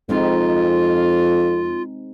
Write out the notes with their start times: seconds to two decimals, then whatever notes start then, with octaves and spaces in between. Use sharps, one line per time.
0.09 F2 G#3 C4 D#4 F4